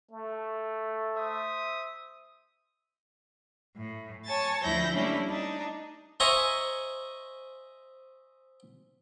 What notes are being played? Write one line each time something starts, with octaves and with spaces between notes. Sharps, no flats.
A3
C5 E5 D#6
A2
C#5 G#5 A5 A6
D2 F3 E4 G6 A#6
G3 A3 A#3 C#4 D4 E4
D4 D#4
C5 D#5 E5 G#5 A#5 C#6